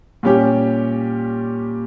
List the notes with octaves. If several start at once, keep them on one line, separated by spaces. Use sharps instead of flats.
A#2 G3 C#4 G4